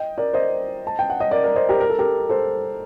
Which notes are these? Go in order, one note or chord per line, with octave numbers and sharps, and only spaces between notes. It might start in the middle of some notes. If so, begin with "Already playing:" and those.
Already playing: D#5 G5
A#4 D5
C5 D#5
A5
G5
F#5
D#5
A#4 D5
A#4 D5
C5 D#5
G4 A#4
A#4
A4
G4 A#4
A4 C5